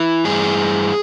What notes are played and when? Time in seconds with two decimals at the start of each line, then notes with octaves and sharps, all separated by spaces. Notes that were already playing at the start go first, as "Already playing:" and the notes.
Already playing: E3
0.25 G2 E3 G#4